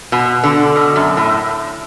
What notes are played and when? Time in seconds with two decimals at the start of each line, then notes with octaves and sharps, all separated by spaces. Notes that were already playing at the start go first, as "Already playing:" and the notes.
0.12 B2
0.44 D3
0.76 B2
0.96 F#2
1.17 A2